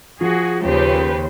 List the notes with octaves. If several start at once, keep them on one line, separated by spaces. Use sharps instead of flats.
F3 F#4 G#4
D#2 C#3 G4 B4 C5